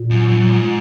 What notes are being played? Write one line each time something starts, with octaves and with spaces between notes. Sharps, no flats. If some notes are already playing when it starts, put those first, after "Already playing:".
Already playing: A#2
F#2
F#2
F#2
G#2